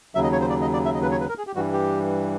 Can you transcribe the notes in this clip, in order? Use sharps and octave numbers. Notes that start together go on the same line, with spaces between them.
D#2 C#3 F#3 E5
D#5
C#5
C5
D5
D#5
D5
E5
D#5
B4
C#5
B4
A#4
G#4
G4
G2 E3 G3 F#4
G4